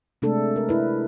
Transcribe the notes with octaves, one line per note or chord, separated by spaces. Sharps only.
C3 G#3 A3 D4 A4
A#4
E4 B4